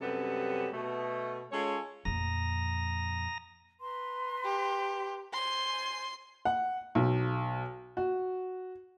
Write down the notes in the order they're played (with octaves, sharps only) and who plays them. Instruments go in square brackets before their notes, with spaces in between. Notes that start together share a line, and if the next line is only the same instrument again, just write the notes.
[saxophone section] F#2 C3 G3 B3 C#4 A4
B2 A3
G#3 C#4 F4 A4 C#5
[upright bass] F2 A#2 [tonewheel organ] A#5 D#6 A#6
[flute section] B4 A#5 C6
[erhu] G4
[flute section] C5 G#5 [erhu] C6
[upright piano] F#5
B1
F#4